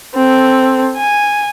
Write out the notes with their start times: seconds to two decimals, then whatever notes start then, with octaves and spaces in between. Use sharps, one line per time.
0.15 C4 A4
0.96 G#5